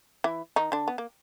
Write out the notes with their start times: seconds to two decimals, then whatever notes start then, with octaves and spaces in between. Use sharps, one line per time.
0.24 E3 E4
0.56 D#3 D#4
0.72 D3 D4
0.88 B3
0.98 A#3